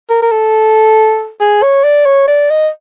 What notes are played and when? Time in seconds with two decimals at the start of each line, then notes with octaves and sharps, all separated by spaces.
0.10 A#4
0.22 A#4
0.32 A4
1.40 G#4
1.62 C#5
1.84 D5
2.06 C#5
2.28 D5
2.50 D#5